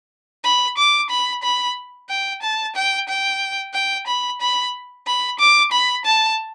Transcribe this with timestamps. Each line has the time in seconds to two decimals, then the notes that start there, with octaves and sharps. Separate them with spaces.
0.44 B5
0.78 D6
1.10 B5
1.43 B5
2.10 G5
2.43 A5
2.76 G5
3.09 G5
3.74 G5
4.07 B5
4.41 B5
5.07 B5
5.39 D6
5.72 B5
6.05 A5